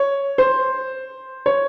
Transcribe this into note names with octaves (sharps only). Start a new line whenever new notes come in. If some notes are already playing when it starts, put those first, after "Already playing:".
Already playing: C#5
C5
C#5